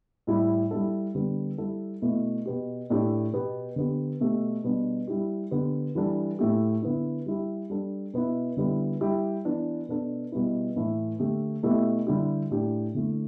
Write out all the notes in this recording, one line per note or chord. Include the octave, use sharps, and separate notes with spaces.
A2 G3 E4 G4
G3 E4 A4
D3 G3 B3
G3 E4 A4
B2 A3 E4
B2 B3 G4
A2 A3 D4 G4
B2 B3 G4
D3 B3 G4
B2 A3 G4
B2 G3 B3 D4
G3 E4 G4
D3 B3 G4
E3 G3 D4 A4
A2 A3 G4
D3 B3 E4
G3 E4 G4
G3 D4 A4
B2 B3 E4
D3 G3 B3 E4
G3 E4 G4
E3 B3 D4
B2 B3 D4 A4
B2 G3 B3 E4
A2 E3 A3 E4 A4
D3 A3 G4
B2 A3 E4 G4
D3 G3 E4 G4
A2 A3 D4 G4
D3 A3 E4